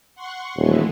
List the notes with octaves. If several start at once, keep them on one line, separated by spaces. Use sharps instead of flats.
F#5 C6 C#6
D#1 E3 G#3 A3